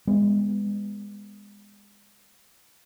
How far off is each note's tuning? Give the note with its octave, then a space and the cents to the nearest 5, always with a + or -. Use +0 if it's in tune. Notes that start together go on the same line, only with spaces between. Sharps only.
G#3 -25 B3 +0